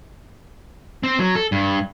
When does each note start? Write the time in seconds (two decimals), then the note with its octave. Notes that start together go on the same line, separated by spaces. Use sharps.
1.03 C4
1.20 F#3
1.35 A4
1.52 G2